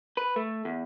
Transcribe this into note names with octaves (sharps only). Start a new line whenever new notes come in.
B4
A3
E2